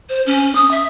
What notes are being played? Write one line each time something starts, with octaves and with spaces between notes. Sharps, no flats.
C5
C#4
D#6
E5